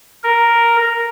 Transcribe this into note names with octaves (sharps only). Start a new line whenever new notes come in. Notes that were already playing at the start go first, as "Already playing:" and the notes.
A#4